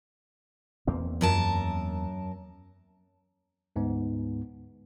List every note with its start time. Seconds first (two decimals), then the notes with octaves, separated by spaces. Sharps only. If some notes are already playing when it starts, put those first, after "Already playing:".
0.87 E2 A#3 C4
1.21 F#2 A#4 A5
3.76 D2 G#2 B3